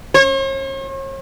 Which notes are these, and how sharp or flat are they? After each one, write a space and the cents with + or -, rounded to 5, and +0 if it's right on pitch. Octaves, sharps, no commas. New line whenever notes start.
C#5 -45